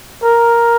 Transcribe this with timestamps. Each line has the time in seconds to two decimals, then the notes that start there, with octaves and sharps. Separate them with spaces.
0.23 A#4